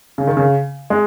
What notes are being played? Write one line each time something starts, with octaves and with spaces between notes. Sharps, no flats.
C#3
D#3
C#3
G#3